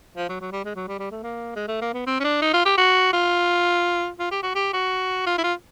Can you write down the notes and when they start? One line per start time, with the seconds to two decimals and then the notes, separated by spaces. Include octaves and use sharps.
0.17 F3
0.29 F#3
0.41 F#3
0.52 G3
0.65 G#3
0.76 F#3
0.88 G3
0.99 G3
1.12 A3
1.23 A#3
1.56 G#3
1.68 A3
1.81 A#3
1.94 B3
2.07 C4
2.20 C#4
2.24 D4
2.42 D#4
2.54 F4
2.65 G4
2.77 F#4
3.13 F4
4.19 F4
4.31 G4
4.43 F#4
4.55 G4
4.73 F#4
5.27 F4
5.38 E4
5.44 F4